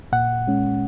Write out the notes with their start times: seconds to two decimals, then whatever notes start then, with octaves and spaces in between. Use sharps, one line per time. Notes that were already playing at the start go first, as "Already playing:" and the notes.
0.12 A#2 F#5
0.47 G#3 C#4